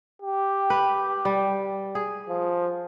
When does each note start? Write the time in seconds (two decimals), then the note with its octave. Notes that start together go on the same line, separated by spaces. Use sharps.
0.22 G4
0.70 B4
1.25 G3
1.95 G#4
2.29 F3